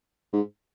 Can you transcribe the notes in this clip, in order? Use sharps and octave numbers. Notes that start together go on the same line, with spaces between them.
G#2